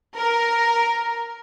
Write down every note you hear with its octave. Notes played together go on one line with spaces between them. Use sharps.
A#4